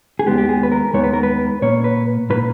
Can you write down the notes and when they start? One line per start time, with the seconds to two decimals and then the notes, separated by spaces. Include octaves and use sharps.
0.19 G#4
0.26 D#2 D#3 G#3 B3 G4
0.38 G4
0.49 G#4
0.63 B4
0.72 A#4
0.94 D#2 D#3 G#3 B3 C#5
1.04 B4
1.13 A#4
1.23 B4
1.62 A#2 A#3 C#5
1.84 B4
2.30 A#2 A#3 B4